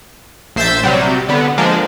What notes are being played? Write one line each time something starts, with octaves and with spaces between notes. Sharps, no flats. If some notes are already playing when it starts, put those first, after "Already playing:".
A#1 C5 E5 E6 G6 A6
C3 F#3 G3
D3 B3
F3 G#3 A#3 D4